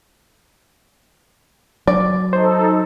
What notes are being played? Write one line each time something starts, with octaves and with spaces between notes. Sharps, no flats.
F#3 D5
D#4 A4 C5